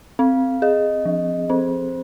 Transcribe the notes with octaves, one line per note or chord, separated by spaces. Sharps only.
C4 F5
G#4 D#5
F3
C4 C5